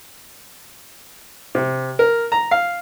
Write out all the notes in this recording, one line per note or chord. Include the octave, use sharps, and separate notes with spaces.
C3
A#4
A#5
F5